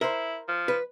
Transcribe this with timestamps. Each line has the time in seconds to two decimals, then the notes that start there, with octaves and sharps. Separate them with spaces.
0.01 E4 A#4 C5
0.48 F3
0.68 B4